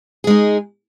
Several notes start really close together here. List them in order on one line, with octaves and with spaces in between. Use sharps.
G#4 G#3 D#4